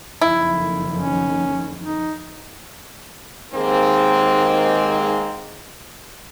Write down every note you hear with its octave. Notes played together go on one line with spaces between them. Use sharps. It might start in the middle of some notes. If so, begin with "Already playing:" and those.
F#1 F2 D#3 E4
C#4
D#4
D#2 G#2 D#3 G#3 A#3 C4